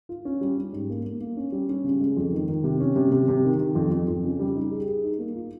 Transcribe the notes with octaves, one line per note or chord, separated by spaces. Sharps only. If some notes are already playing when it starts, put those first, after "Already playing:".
F4
C#4
G3
C#4
G#2
A#3
A#3
A#3
C#4
G3
C#4
C#3
G#3
F2
D#3
D#3
C3
C#4
C3
C3
C3
D#3
D#3
F2
F2
F2
C#3
G3
D#4
G#4
G#4
D#4
A#3
F4